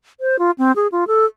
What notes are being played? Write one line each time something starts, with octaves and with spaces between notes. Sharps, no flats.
C5
F4
C4
G#4
F4
A4